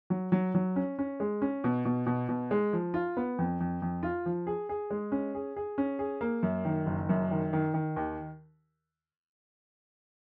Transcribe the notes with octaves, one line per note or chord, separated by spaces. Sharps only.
F#3
F#3
F#3
C#4
C#4
G#3
C#4
B2
B2
B2
B2
G#3
F3
F4
B3
F2
F2
F2
F4
F3
G#4
G#4
G#3
C#4
G#4
G#4
C#4
G#4
A#3
F#2
D#3
F#1
F#2
D#3
D#3
D#3
D#2